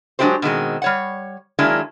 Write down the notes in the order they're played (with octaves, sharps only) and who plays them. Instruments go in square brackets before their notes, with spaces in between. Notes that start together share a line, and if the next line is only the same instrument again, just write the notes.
[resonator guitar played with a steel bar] F#3 G#3 D4 E4 G4 C5
B2 D#3 G#3 C4
G3 C#5 F#5
D#3 F#3 G#3 A#3 D4 E4